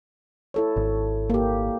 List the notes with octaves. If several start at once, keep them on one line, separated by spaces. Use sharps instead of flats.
E4 A4 C#5
G#1
A#3 G4